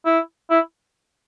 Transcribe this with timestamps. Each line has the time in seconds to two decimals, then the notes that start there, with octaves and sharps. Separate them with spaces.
0.05 E4
0.50 E4